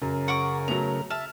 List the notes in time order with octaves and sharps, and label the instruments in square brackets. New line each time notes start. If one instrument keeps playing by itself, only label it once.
[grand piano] F#2 [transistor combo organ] C#3 A#4
[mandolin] F#5 C#6 D6
[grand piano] F#3 A3 B3 [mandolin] A#5
[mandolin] E5 A5 [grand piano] F6